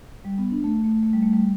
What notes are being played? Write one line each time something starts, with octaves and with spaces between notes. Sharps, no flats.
G3
B3
D4
A3
A3
A3
G3
A3
G3